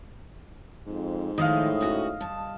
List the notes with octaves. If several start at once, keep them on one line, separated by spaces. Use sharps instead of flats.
F2 G#2
A2 D#3 F3 E4 D#5 F5
D2 C#4 F#4
G2 A5